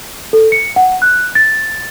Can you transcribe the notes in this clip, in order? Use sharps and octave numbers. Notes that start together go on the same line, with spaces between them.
A4
C#7
F#5
F#6
A6